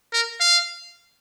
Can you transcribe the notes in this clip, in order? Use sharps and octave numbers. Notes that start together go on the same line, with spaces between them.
A#4
F5